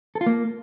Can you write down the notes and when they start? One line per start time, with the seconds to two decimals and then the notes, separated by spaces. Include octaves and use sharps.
0.15 A4
0.21 F4
0.26 A#3